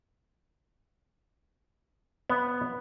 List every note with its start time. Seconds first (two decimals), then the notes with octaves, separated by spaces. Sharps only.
2.30 B3